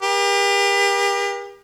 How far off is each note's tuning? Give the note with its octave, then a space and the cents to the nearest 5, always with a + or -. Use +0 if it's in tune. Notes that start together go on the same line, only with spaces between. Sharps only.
G4 +35 A#4 +45